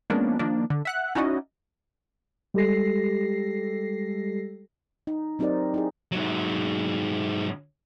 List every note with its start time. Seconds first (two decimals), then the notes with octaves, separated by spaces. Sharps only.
0.10 F3 G#3 A#3 B3 C#4 D4
0.39 D#3 F3 A#3 D4
0.70 D3
0.85 E5 F#5 F#6
1.15 C#4 D#4 E4 F#4 D5 D#5
2.54 G3 G#3 G4 A4 A#6 C7
5.07 D#4
5.39 F#3 C4 D#4 G4 A#4 D5
5.74 D#4 E4 G#4
6.12 G#2 F#3